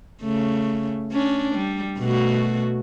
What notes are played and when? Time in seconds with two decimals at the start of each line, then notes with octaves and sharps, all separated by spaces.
0.22 C#3 A3
1.12 C#4 D4
1.55 G3
1.98 B2 A3 F#4